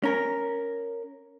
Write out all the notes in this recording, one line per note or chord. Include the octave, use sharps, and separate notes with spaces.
C#4 A#4